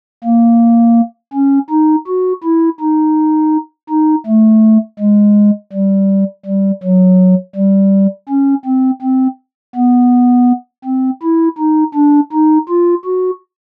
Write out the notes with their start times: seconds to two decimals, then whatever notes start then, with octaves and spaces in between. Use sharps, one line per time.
0.24 A#3
1.34 C#4
1.70 D#4
2.07 F#4
2.43 E4
2.80 D#4
3.89 D#4
4.27 A3
4.99 G#3
5.73 G3
6.46 G3
6.83 F#3
7.55 G3
8.29 C#4
8.65 C4
9.02 C4
9.75 B3
10.85 C4
11.23 E4
11.58 D#4
11.95 D4
12.32 D#4
12.69 F4
13.05 F#4